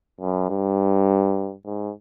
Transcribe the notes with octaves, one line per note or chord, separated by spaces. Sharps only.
F#2
G2
G#2